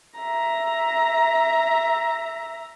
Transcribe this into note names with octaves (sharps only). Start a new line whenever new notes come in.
E5 A#5